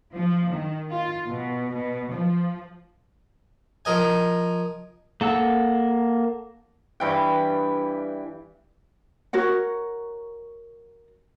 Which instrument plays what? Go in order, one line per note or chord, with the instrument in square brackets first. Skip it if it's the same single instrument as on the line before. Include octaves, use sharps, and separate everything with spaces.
[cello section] F3
D#3
F4
B2
B2
F3
[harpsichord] F3 A#4 D#5 G#5
[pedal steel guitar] A#3 A4 F#5 E6
[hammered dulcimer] G2 E3 G5
[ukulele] F#4 A#4 C#5 F#5